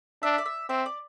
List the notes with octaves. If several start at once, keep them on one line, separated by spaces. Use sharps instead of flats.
D4 E5
D5
E5
C4 E5
D5